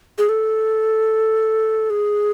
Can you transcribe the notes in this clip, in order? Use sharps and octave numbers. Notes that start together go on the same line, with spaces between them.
G#4
A4
G#4